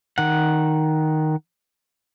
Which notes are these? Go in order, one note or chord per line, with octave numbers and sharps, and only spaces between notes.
D#3 F#5